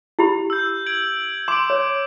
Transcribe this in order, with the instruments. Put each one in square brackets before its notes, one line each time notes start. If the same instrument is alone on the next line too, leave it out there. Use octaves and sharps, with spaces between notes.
[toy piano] E4 G4 B5
[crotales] E6 G6
G#6 D7 F#7
[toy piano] C6 [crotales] D6 D7
[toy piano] C#5